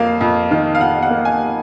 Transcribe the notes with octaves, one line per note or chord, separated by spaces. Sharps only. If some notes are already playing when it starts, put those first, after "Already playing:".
Already playing: F2 A#3 F5
F2
D#3
F5
F2 F#5
F#5
A#3
G#5